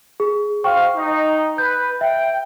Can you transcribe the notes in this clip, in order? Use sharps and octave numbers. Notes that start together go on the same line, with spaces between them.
G#4
F#4 C5 F5 G5 C#6
D#4
B4 G6
E5 G5